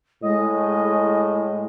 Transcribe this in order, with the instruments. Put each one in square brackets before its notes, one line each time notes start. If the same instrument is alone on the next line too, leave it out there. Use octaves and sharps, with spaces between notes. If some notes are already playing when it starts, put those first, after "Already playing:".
[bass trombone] A2 [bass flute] G#3 [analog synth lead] D#5